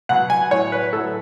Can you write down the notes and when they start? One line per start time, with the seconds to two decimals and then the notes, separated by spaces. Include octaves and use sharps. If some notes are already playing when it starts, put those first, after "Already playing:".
0.09 B2 F#3 F#5
0.30 G#5
0.51 A2 F#3 C#5
0.72 B4
0.92 A2 F#3 A4